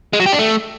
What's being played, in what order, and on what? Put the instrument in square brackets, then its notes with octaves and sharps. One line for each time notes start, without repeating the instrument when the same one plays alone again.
[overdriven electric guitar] G#3
F#3
G4
D4
A3